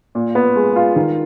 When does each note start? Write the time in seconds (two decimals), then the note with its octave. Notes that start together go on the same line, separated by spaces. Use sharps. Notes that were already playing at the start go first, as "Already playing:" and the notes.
0.15 A#2
0.35 B3
0.56 G#3
0.76 F4
0.96 D#3